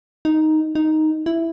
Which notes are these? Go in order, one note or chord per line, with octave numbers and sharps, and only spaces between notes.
D#4
D#4
E4